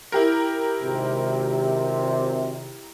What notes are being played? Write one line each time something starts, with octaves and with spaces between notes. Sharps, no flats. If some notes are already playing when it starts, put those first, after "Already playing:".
E4 G4 A#4
G#1 C3